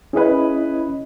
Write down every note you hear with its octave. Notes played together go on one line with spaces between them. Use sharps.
C#4 E4 G#4 B4 D#5